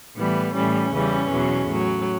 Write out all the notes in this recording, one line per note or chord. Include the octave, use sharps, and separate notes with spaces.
A2 E3 G3 B3
A2 E3 G3 C#4
E2 C#3 E3 G3
E2 B2 F#3
A2 F#3